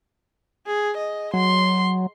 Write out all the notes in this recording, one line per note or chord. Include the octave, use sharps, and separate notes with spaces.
G#4
D#5
F#3 C6